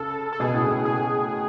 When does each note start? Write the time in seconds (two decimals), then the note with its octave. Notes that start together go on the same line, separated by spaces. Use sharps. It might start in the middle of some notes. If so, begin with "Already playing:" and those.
Already playing: C#3 A4
0.33 A4
0.40 B2 G#4
0.54 A2
0.67 B2
0.85 G#4